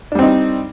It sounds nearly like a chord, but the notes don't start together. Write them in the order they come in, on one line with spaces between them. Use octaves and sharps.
D4 G3 C4 D#4